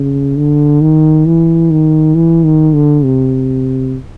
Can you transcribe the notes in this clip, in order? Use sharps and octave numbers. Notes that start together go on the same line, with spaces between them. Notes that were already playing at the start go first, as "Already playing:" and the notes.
Already playing: C#3
D3
D#3
E3
D#3
E3
D#3
D3
C3